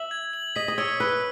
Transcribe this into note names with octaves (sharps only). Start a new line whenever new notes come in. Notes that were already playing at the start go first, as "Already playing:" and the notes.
Already playing: E5 F#7
G#6
F#7
D#5 B6
D#5
C#5 E6
B4 E6